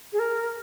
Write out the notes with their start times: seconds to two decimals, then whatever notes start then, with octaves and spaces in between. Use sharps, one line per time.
0.13 G#4
0.19 A#4